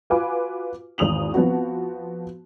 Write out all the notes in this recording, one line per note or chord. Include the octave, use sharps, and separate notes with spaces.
F4 F#4 B4 F5 G#5 D6
G#1 E2 D#6 F7 F#7
F3 B3 C4 F#4